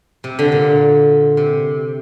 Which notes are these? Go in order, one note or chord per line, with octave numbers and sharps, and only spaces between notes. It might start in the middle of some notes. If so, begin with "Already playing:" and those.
C3
D3
A#2
C3